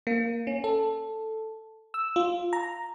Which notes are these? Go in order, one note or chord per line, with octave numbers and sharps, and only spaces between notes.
A#3
C#4
A4
E6
F4
A#5